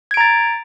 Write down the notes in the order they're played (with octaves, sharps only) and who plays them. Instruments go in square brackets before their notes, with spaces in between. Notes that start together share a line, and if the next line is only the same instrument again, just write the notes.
[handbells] G#6
D7
A#5
A6